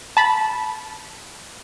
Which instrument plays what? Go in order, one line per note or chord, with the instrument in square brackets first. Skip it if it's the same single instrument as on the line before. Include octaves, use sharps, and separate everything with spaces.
[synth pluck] A5 B5